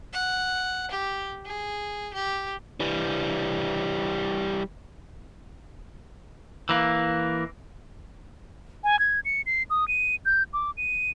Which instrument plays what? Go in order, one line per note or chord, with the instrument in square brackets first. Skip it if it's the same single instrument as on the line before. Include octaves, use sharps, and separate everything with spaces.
[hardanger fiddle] F#5
G4
G#4
G4
[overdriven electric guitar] E3 G3
[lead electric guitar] E3 A#3
[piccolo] G#5
G#6
C#7
C7
D#6
D#7
G6
D6
D#7